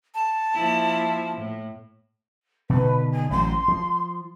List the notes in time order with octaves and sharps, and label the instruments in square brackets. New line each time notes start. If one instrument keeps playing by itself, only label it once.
[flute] A5
[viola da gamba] F3 A#3 E4
A2
[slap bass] B2 D3 D#3 [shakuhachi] B4
[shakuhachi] G#5
[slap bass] A1 F#3 [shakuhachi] C6
[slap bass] F3